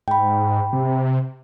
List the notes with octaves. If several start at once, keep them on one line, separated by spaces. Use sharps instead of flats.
G#2 G5 B5
C3